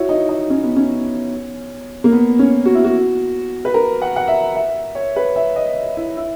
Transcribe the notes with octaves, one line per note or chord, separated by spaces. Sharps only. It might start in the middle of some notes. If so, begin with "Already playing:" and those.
Already playing: E4 F#4 C#5
D#4
D#4
C#4
B3
C#4
A#3
B3
C#4
F#4
E4
F#4
B4
A#4
F#5
F#5
E5
E5
C#5
B4
E5
D#5
E4
E4